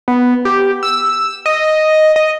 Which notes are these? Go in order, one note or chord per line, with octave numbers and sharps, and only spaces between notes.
B3
G4
E6
D#5
D#5